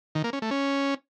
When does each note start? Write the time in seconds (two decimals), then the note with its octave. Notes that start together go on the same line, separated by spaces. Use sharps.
0.15 D#3
0.24 A#3
0.33 C#4
0.42 A3
0.51 C#4